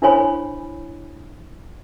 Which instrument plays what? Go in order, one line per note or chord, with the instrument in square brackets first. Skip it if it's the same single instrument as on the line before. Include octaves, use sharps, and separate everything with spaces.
[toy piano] D4 E4 C5 C#5 G#5 B5